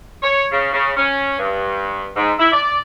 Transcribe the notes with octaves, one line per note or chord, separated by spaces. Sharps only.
C#5
C#3
C#3
C#4
G2
G#2
E4
D5